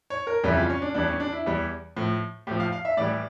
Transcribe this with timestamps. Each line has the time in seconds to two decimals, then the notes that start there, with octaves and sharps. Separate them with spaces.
0.10 C#5
0.27 A#4
0.44 F2 C#3 E3 G3 E4
0.57 F4
0.70 C#4
0.82 D4
0.94 E2 E3 G3 D4
1.07 C#4
1.20 D4
1.32 E4
1.46 E2 E3 G3
1.96 A2 F3
2.47 A2 F3 G4
2.60 F5
2.72 F5
2.85 E5
2.97 A2 E3 G3 D5